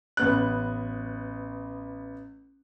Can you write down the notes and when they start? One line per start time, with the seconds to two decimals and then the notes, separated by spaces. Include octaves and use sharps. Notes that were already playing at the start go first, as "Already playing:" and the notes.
0.17 A1 B3 F#6